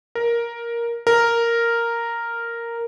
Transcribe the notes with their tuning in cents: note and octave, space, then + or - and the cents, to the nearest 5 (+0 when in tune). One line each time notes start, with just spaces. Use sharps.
A#4 +5
A#4 -5